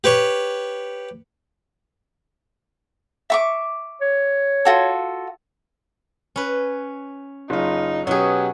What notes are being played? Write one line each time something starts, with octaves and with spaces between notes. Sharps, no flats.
G4 B4 C#5 C#6
E5 C#6 D6
C#5
F4 F#4 A4
C#4 B4
F#1 D#4 F4
B2 F#3 C#4 G4 G#4